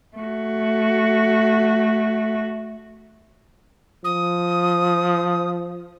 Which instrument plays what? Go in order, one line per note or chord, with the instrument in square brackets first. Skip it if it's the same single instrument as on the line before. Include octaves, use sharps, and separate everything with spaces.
[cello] A3 F#4
[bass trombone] F3 [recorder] D#6